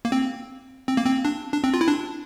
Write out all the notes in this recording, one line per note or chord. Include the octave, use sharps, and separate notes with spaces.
A#3
C4
C4
A#3
C4
D4
D4
C4
F4
E4
D4